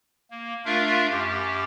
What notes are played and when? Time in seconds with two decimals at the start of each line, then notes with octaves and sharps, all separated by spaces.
0.31 A#3
0.65 A3 D4 F4 A#4 E5 F5
1.09 F#2 G4